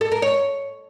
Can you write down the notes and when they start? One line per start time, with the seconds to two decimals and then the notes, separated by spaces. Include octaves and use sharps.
0.01 A4
0.12 A#4
0.22 C#5